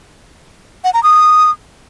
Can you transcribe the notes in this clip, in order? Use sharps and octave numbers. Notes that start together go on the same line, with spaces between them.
F#5
A#5
D#6